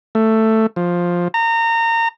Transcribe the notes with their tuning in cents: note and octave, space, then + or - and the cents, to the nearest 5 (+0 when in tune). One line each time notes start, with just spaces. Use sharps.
A3 +10
F3 +10
A#5 -25